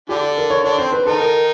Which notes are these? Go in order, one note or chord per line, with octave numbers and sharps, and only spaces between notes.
D3 D4 G4
A#4
C#5
D3 D4 C#5
C4 C5
B4
D#3 D#4 A4
A#4